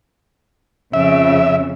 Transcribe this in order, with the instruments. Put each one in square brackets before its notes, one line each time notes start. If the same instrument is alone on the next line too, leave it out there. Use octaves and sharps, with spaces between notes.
[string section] F2 C#3 [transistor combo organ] E5